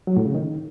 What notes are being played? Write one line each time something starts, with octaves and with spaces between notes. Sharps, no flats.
F#3
A2
C#3
D#3